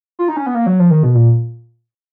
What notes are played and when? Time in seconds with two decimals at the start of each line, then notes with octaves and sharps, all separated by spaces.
0.19 F4
0.28 D#4
0.37 C#4
0.46 B3
0.55 A#3
0.66 F#3
0.79 F3
0.90 D#3
1.03 B2
1.15 A#2